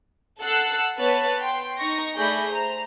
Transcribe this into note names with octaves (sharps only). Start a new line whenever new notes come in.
A4 F#5 A5 E6 F#6 C7
B3 B4 C#5 A5 A6
G5 C6
D#4 C#6 A#6
A3 G#4 D5 B5 G6 A#6
C5 A#5